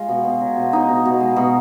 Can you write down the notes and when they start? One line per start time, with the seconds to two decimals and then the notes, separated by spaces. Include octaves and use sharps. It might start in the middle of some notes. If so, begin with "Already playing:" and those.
Already playing: G#3 F4
0.08 B2
0.24 B2
0.41 F#3
0.56 B2
0.72 B2 D#4
0.89 B2
1.05 B2
1.20 G#3
1.36 B2